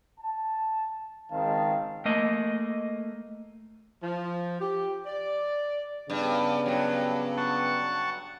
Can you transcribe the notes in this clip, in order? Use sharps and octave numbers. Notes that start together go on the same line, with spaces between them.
A5
C#2 D#3 G#3 C4 F5 A5
A3 A#3 D#5
F3
G4
D5
G2 C#3 B3 D4
G2 F#3
F#5 A5 C#6